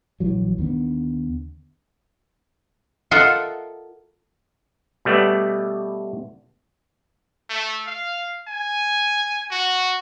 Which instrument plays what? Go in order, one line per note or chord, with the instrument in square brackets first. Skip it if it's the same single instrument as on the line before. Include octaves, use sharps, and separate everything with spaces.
[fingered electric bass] A#1 E3 F#3
D#2 D3 B3
[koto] F4 A4 A#4 D#5 E5 F#5
[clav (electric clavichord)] B2 G3 A3 B3 D5
[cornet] A3
F5
G#5
F#4